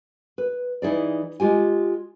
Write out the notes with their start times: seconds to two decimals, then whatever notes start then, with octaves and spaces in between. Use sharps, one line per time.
0.38 B4
0.82 E3 D#4 E4 G#4 D5
1.40 G#3 F4 G4 G#5